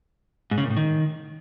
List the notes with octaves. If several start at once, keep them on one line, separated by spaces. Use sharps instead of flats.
G#2
C#3
A#2
A2
D#3